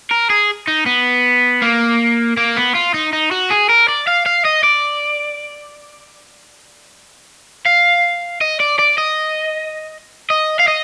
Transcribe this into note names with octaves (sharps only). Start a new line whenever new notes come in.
A#4
G#4
D#4
B3
A#3
A#3
B3
F4
D#4
D#4
F#4
G#4
A#4
D5
F5
F5
D#5
D5
F5
D#5
D5
D5
D#5
D#5
F5
D#5